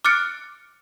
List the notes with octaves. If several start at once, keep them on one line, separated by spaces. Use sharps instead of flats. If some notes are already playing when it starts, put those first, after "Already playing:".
D6 F6 F#6 A6 C#7 D7